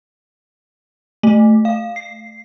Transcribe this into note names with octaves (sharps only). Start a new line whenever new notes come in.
A3
F5
C7